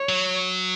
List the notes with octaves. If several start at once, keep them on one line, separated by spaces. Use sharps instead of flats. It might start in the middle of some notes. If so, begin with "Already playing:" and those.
Already playing: C#5
F#3